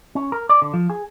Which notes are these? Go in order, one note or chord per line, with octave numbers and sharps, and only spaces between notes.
C#4
A#4
D5
D3
F3
G#4